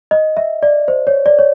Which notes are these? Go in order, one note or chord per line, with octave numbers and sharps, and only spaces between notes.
D#5
E5
D5
C5
C#5
D5
C#5